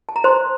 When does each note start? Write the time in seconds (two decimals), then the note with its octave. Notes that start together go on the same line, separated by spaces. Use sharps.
0.09 A5
0.16 A#5
0.24 C5 C6